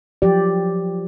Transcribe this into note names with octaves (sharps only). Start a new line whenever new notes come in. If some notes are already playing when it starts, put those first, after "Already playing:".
F3 F#3 G4 D5